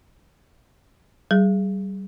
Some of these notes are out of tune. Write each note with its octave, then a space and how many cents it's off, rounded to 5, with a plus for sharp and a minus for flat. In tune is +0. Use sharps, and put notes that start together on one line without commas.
G3 -25 G#4 +0